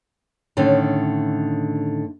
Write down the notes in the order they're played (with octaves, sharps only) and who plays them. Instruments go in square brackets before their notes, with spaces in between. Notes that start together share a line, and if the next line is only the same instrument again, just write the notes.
[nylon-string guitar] A2 D3 D#3 C#4